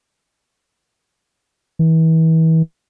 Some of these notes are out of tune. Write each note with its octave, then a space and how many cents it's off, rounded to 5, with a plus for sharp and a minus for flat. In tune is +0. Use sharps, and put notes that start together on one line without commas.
E3 -35